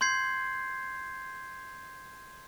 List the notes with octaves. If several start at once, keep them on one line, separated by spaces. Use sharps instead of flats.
C6 G6 G#6 C7